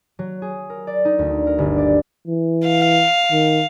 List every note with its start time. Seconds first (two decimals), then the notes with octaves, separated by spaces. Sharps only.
0.19 F#3
0.42 G#4
0.70 A#4
0.87 D5
1.05 D#4
1.19 D2
1.47 A#4
1.58 G1
1.78 D5
2.27 E3
2.66 F5
3.32 D#3